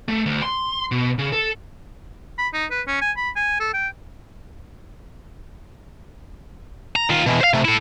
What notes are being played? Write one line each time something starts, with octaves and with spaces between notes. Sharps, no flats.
A3
D2
C6
B2
C#3
A4
B5
D#4
B4
C#4
G#5
B5
G#5
A4
G5
A#5
D#3 F4
B2 E3
C5 F5
C3 A3
E4 A4